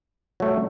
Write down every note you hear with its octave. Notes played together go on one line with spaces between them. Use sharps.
F#3 A3